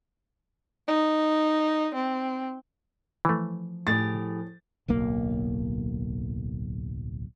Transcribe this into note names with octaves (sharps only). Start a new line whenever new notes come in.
D#4
C4
E3 F3 A3
A2 G4 G#4 A6
D1 B1 A#3